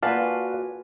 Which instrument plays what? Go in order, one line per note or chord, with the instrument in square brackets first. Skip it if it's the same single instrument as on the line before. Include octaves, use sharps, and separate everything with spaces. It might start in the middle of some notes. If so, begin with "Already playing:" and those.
[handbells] A#3 G#5 [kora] F4 B4 [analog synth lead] F#4 [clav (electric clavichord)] D5 F5 A5